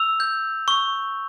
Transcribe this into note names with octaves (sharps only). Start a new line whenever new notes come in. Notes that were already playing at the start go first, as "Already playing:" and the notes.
Already playing: E6 F7
G6
C#6